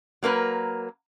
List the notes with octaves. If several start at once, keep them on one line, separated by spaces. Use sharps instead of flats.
F#3 A#3 A#4 B4